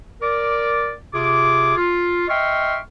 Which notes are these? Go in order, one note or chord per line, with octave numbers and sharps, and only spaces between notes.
A#4 D5 D6
C3 F4 G#4 D6
F4
D#5 E5 G5 C6 C#6 F6